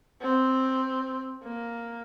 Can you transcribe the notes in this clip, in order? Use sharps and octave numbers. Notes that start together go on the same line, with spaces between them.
C4
A#3